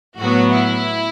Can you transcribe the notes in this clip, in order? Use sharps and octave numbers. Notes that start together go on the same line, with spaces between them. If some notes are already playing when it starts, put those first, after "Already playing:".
A2 F#3 B3 F#4
E4